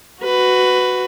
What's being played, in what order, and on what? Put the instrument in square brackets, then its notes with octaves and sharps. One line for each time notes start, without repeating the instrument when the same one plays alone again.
[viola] F#4 B4